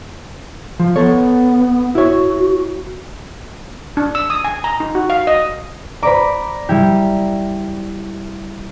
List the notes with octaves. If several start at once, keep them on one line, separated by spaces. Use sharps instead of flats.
F3
B3 A4 C#5
E4 F#4 C#5
D4
E6
D#6
G#5
A#5
D#4
F#4
F5
D#5
C5 D5 A#5 B5 D6
G3 E4 G4